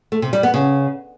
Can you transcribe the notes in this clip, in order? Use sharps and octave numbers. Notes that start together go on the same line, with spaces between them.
A3
C3
G3
B3
C#3